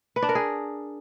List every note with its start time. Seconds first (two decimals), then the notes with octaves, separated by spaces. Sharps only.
0.16 B4
0.23 D4
0.29 A#4
0.35 G#4